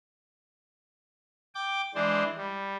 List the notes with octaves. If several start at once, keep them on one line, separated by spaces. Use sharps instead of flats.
G5 D6
E3 G#3 D4 C5
G3